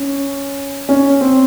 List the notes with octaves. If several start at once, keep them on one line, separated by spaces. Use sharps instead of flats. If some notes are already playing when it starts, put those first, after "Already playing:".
Already playing: C#4
C#4
C4